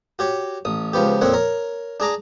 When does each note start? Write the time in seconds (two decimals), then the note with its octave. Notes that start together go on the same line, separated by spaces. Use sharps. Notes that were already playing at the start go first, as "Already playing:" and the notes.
0.19 F#4 G4 C#5
0.65 A1 D#6
0.93 C#2 F3 B3 G4
1.21 F2 A#2 C4 C#5 F#5
1.34 A#4 C#5
2.00 D4 G#4 A#5 D6